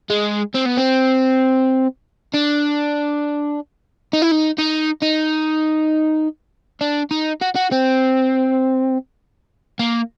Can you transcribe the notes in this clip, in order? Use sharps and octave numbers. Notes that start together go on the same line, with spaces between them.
G#3
C4
B3
C4
D4
D#4
E4
D#4
D#4
D#4
D4
D#4
F#4
F#4
C4
A#3